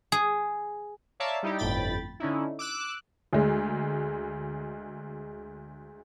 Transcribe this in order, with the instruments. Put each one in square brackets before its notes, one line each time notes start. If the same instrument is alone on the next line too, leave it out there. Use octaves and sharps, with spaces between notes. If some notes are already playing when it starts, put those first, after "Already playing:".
[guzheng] G#4
[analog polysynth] C#5 D5 E5 F5 A5 A#5
G3 D#4 E4 G4
G1 F2 A2 G5 B5 A6
D3 C#4 D#4 E4
D6 E6 F#6
[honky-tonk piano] D2 G#3